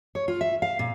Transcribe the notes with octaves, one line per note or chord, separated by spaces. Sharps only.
C#5
F4
E5
F5
A#2